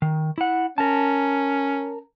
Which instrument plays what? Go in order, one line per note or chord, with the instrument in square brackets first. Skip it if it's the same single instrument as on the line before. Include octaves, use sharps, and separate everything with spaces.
[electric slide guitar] D#3
E4 F#5
[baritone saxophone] C#4 [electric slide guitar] A#4 A5